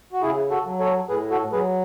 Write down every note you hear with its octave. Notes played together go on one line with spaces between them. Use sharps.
F#4
C#3 E4 G#4
F#4 A4
F#3
A4 C#5
A2 G#4 B4
F#4 A4
F#3 G#4 B4